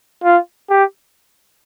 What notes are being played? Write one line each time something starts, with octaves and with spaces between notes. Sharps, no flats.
F4
G4